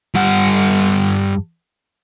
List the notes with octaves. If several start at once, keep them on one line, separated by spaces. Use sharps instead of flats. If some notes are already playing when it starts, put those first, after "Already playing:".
G2 F#5